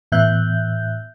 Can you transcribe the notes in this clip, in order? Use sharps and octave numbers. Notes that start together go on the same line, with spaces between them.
A2 E3 B3 E5 F#6 G6